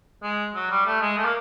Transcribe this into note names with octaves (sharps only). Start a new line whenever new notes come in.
G#3
F#3
G3
A3
G#3
A3
A#3